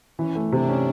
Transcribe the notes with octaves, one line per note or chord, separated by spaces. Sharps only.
E3 C#4
A3
C3 D4
C#4